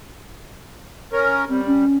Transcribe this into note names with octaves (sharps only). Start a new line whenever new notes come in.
C#4 A#4
G3 C4
C#4